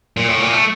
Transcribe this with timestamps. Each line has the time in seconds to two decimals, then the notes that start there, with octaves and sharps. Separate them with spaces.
0.17 A#2
0.28 A2
0.40 A#2
0.52 A3